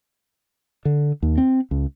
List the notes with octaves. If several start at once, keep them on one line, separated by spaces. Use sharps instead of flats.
D3
D#2
C4
C#2